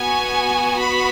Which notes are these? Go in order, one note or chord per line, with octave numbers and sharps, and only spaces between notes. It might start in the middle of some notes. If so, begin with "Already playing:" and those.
Already playing: B3 F#4 G#5
B5